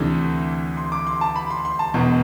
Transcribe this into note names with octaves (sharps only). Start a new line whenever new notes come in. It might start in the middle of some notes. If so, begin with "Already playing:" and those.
Already playing: D2 C3 E3 A3 D4
C6
D6
C6
A5
B5
C6
C6
A5
E1 E2 B2